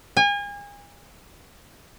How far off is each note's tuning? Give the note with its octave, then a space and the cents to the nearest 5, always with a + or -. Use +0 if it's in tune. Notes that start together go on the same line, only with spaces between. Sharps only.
G#5 -35